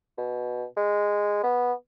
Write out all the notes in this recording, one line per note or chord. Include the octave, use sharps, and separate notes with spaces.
B2
G#3
B3